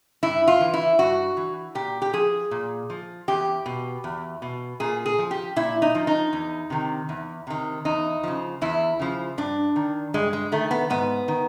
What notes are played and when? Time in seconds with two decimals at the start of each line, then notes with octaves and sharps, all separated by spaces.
0.23 G2 E4
0.48 F4
0.61 E3
0.74 E4
0.99 G2 F#4
1.37 E3
1.75 A#2 G4
2.02 G4
2.13 F3 G#4
2.51 A#2
2.90 F3
3.28 E2 G4
3.66 B2
4.04 E2
4.42 B2
4.80 A#2 G#4
5.06 G#4
5.19 F3
5.31 G4
5.56 A#2 E4
5.82 D#4
5.95 F3
6.07 D#4
6.33 E2
6.70 C3 D#3
7.09 E2
7.47 C3 D#3
7.85 E2 D#4
8.23 C#3 F3
8.61 E2 E4
8.99 C#3 F3
9.38 G2 D4
9.76 D#3
10.14 G2 G#3
10.33 G#3
10.52 D#3 A3
10.71 B3
10.90 G#2 B3
11.28 D#3